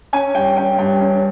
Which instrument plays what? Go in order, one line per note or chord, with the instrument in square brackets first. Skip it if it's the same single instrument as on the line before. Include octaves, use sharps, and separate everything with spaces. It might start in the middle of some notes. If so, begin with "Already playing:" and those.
[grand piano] C#4 [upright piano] G#5
[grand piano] G2 [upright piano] G5
[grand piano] C#4 [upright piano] G5
[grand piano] G2 [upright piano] G5
[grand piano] C#4